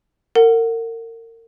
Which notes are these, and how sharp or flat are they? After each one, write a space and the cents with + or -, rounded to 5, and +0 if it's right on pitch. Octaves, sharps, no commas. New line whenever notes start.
A#4 -35 F#5 +0